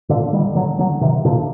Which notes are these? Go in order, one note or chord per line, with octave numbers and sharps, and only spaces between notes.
A#2 D3
D#3 G3
D3 F#3
D3 F#3
C3 D#3
A#2 D3